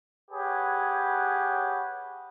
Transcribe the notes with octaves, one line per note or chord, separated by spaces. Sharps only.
G4 G#4 B4 C#5 F#5